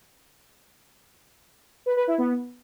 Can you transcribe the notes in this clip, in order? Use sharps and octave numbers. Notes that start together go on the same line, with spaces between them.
B4
B4
E4
B3